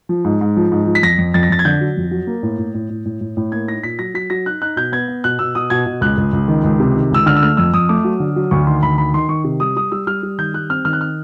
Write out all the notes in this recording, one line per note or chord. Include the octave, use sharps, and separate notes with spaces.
F3
G#2
G#2
F3
G#2
F3
B6
F2 A#6
F2
F2 A6
A#6
F2 A6
G#6
D3 G6
F#3
F2
F#3
A#3
A2
A2
A2
A2
A2
A2
A2
A#3 G#6
D#4 A#6
A#2 B6
F#3 A#6
F#3 B6
F#3 A#6
D#4 F#6
D#4 F#6
B2 G6
B3 G#6
B3
B2 F#6
B2 E6
B2 D#6
B2 G#6
B2
C#2 F#6
C#2
C#2
D#3
C#2
C3
D#3
C#2 E6
D3 F6
E6
A3 F6
F2 E6
F2 D#6
A3 D6
F#3
D3
F#3
D2 C#6
D#3 C6
D2 B5
D#3 B5
D#3 C6
D#3 C#6
C3
G3 D#6
G3 D#6
G3 E6
G3 F6
G3
D#3 G6
G3 F#6
C4 F6
D#3 F6
F#6
F6